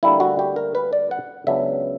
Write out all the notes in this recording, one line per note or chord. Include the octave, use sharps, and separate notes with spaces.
D2 D3 G3 A#3 E4
F#4
G4
A#4
B4
D5
F#5
C#2 C#3 F#3 B3 D4 E5